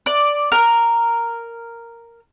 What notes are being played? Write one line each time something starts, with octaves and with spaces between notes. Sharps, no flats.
D5
A#4